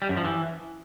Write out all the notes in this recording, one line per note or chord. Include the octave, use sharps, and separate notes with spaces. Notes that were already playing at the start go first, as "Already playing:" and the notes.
G3
F#2
F3
E3